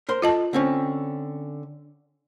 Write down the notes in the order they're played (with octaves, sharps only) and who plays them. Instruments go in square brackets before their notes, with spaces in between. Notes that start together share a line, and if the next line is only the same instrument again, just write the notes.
[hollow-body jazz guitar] A#4 C5 C6
[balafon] F4 D#5 A5 [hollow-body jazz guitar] A4
[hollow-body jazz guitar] D3 C4 C#4